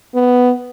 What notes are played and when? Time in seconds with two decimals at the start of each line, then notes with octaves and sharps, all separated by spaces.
0.15 B3